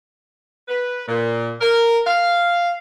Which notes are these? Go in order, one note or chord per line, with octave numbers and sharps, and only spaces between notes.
B4
A#2
A#4
F5